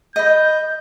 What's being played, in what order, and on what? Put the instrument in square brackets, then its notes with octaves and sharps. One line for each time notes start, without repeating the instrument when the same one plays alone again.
[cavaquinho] D#5 B5 [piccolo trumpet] G6